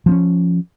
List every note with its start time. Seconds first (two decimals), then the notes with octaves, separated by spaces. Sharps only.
0.06 F3
0.09 C4
0.11 C#4